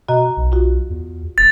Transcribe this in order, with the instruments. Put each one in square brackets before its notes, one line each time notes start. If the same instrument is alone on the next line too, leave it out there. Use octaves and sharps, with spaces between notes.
[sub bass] B2 [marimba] F#4 D#5 A#5
[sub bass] B1
[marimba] F4 F#4
[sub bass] E2
[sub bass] D#1 [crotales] A6